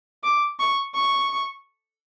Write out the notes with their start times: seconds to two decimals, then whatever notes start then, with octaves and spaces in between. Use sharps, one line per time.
0.23 D6
0.59 C#6
0.95 C#6